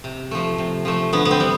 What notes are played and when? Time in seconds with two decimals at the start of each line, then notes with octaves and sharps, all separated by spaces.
0.04 C3
0.31 F3 A3
0.58 C3
0.85 F3 A3
1.13 D3 B3
1.25 B3
1.31 C4
1.40 G3